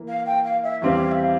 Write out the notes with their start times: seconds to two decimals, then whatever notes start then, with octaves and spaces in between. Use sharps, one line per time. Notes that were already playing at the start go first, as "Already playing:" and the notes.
Already playing: E3 A#3
0.08 F5
0.26 G5
0.45 F5
0.63 E5
0.82 E2 E3 G3 C4 G4 F5
1.11 E5
1.19 F5